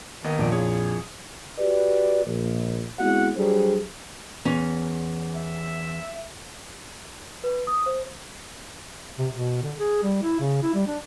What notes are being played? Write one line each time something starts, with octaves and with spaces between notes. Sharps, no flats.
D#2 D#3 B3 D#5
A#1 F2 D5
E4 G#4 C#5
F#4 G4 B4 D5
A#1
G#3 B3 C4 E4 F#4 F#5
F#3 G3 D4 G#4 A4 C5
E2 C#4
E5
B4
D#6
C5
C3
B2
D3
G#4
G3
E4
C#3
E4
G3
D4